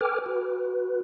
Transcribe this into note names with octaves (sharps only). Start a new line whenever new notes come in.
A4 B4 G5 G#5 D6 F6
F#4 B4